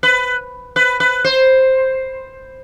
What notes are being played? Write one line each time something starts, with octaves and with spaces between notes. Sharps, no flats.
B4
B4
B4
C5